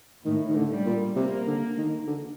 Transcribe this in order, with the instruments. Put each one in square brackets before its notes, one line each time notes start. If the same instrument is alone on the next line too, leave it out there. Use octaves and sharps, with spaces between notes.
[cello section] A2 [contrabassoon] D#3
[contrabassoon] D#3
D3
[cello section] G3
[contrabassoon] A#2
[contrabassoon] C3 [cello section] A#3
[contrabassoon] D3
D#3
D3